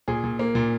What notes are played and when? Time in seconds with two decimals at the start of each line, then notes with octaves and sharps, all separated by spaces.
0.08 A#2 G#4
0.24 A#2
0.39 A#3
0.55 A#2